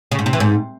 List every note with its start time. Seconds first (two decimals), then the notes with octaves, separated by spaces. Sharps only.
0.12 C#3
0.19 G#2
0.26 C3
0.33 E3
0.40 G#2